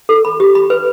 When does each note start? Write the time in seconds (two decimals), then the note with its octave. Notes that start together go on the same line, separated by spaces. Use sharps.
0.09 A4
0.25 B5
0.40 G4
0.55 B5
0.70 B4